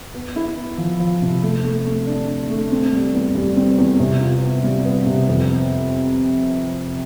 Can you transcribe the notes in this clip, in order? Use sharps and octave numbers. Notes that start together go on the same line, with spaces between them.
B3
E4
B3
F3
F3
C3
A3
A3
A3
D4
D4
A3
C4
G3
E2
G3
C4
E2
C3
F4
B3
G3
B3
C3
F2
B3